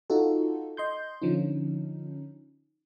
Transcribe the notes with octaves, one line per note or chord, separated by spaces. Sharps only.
D#4 F4 F#4 A4
D#5 C6 G6
D3 F3 C#4 D#4